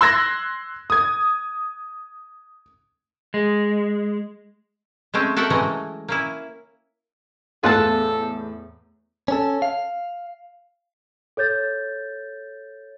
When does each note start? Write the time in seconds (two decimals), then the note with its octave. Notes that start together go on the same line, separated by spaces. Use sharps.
0.01 C6 E6 F#6 G#6 A#6
0.90 D#6 G#6
3.34 G#3
5.14 G#3 A3 C4 C#4
5.36 F#4 A4 A#4 E5 F#5 G5
5.50 E3 F#3 G#3 A3 C#4 D#5
6.08 A#3 C#4 E4
7.64 E2 A2 F4 A4 F#5 A5
9.28 C#4 A4
9.62 F5
11.37 A4 C#5 G6 A6